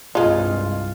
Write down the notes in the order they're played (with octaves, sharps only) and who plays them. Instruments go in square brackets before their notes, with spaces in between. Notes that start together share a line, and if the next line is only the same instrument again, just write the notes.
[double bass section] C2 G2 [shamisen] G#3 D#4 [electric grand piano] F4